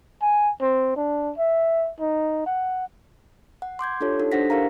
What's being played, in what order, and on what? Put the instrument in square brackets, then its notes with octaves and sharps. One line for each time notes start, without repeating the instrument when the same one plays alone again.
[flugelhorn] G#5
C4
D4
E5
D#4
F#5
[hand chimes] F#5
C6 D6 G6 G#6
D4 F4 G4 A4 C#5
D#4 F#4 A4
D4 G4 C5 F#5 A#6 B6
E4 G4 A#4 F5 A#5